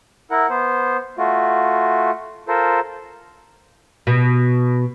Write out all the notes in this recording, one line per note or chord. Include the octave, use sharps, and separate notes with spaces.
E4 A#4 F#5
B3 C5
A3 F4 F#4
F4 A4 A#4 C5
B2